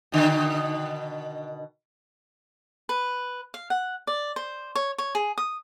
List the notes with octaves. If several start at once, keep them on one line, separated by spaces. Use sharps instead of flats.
B2 D3 D#3
B4
F5
F#5
D5
C5
C#5
C#5
G#4
D#6